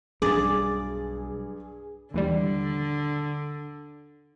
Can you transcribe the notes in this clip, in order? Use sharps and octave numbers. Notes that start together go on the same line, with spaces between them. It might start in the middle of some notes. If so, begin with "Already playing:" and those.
B1 G2 F#3 G3 G#4 D5 A6
D#2 D3 E3 G3